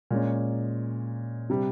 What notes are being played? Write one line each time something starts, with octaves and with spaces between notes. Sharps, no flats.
A#2 G#3 C#4
C3 G3